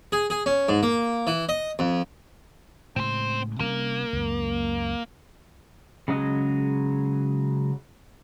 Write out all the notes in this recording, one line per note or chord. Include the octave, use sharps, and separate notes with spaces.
G#4
G#4
C#4
G#2
A#3
E3
D#5
F2
A2 C#3 G#3 C4 C5
C3 G3 A#3 C#4
C#2 F#2
C#3 F#3 G#3 F#4 D#5